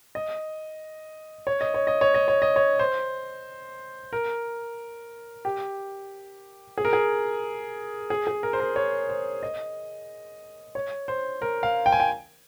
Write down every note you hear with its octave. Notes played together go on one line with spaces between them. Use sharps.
D#5
C#5
D#5
C#5
D#5
C#5
D#5
C#5
D#5
C#5
C5
A#4
G4
G#4
A#4
G#4
G#4
G#4
A#4
C5
A#4
C#5
C5
D#5
C#5
C5
A#4
F5
G5
G#5
G5